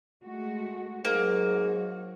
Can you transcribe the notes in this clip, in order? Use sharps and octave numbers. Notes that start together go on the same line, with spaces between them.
G#3 A3 F#4
G#2 F#3 A#3 F#4